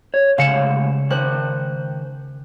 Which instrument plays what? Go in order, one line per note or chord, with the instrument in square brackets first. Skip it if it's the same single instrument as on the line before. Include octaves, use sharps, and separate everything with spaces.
[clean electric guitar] C#5
[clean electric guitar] D2 G#2 F5 [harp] C#3 C#7 E7
[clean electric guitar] D#3 C5 [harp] F#6